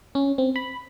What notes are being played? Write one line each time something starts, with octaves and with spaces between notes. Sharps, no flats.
C#4
C4
B5